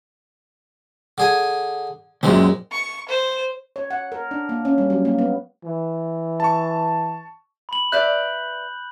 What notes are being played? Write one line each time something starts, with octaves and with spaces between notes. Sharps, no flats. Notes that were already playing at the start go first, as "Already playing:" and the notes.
D3 G#4 G#5
C#2 F#2 A#2 G#3 C4
C#6
C5
C#5
F#5
A#4
D4
A#3
C#4
G3
F#3
A#3
B3
E3
A5 C#6
B5 F#7
B4 D5 E5 F#6 G6